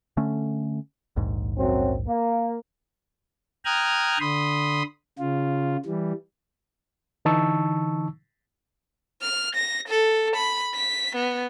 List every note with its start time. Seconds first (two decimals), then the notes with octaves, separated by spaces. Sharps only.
0.17 D3 A3 C#4
1.16 A#1 D#2 G#2
1.58 F#2 F#3 C4
2.08 A#3
3.65 G5 A#5 D#6 F6 F#6 G#6
4.20 D3 B5 C6 D#6
5.19 C#3 F4
5.86 E3 G3
7.25 D3 E3 D#4 A5 C#6 E6
9.22 F6
9.55 A#6
9.88 A4
10.36 B5
10.74 B6
11.16 B3